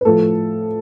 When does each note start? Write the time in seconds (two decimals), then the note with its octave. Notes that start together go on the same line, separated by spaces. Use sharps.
0.01 B4
0.05 A2 F3 A4